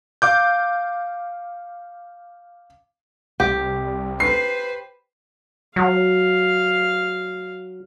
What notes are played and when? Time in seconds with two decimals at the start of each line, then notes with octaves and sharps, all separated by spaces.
0.22 F5 D6 G6
3.40 C2 G4
4.20 B4 C5 C7
5.76 F#3 F5